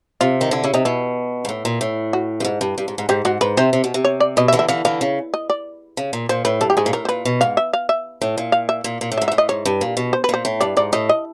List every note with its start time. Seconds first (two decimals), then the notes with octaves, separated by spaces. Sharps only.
0.21 C3 F4
0.41 D#3
0.51 D3 E4
0.64 C#3 E4
0.74 C3 D#4
0.85 B2 E4
1.45 G#2
1.49 A2
1.65 A#2
1.81 A2
2.13 F#4
2.40 G2
2.45 G#2
2.61 G2
2.78 G2
2.88 G#2
2.98 G#2
3.09 G#2 G4
3.25 G#2 F#4
3.41 G#2 B4
3.57 C3 C5
3.73 C3
3.84 B2
3.94 C3
4.05 C#5
4.20 D5
4.37 B2 D#5
4.48 E5
4.53 D3 E3
4.59 E5
4.68 D3 E3 F5
4.85 D3 E3 F5
5.01 C#3
5.34 D#5
5.50 D5
5.97 C#3
6.13 A#2
6.29 A#2 C5
6.45 A2 B4
6.61 G2 A4
6.70 G4
6.77 G#2 G#4
6.86 A#2
6.93 A2 A#4
7.05 C5
7.09 A#2 B4
7.25 B2
7.41 G#2 F5
7.57 E5
7.73 F5
7.89 E5
8.22 A2
8.38 A#2
8.52 F5
8.69 E5
8.84 A#2
9.01 A#2
9.12 A2
9.18 E5
9.22 G#2
9.28 A2 E5
9.38 D#5
9.49 G#2 C#5
9.65 G2
9.81 A#2
9.97 B2
10.13 C5
10.24 B4
10.29 A#2 C5
10.45 A2
10.61 G2 D5
10.77 G#2 D5
10.93 A2 D#5
11.09 D#5